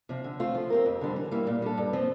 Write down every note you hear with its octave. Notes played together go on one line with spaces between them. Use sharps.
C3 F3
D3
A3 C4 F4
F3
C4 G4 A#4
F2
D3 G3 C4
E3
G3 A#3 E4
A#2
G3 D4 A4
G2
F3 C4